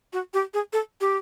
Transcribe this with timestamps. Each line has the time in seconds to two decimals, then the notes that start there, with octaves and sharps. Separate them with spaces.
0.13 F#4
0.34 G4
0.54 G#4
0.73 A4
1.01 G4